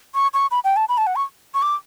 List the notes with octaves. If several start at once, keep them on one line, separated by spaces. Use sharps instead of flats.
C#6
C#6
B5
G5
A5
B5
A5
F#5
C#6
C#6
D6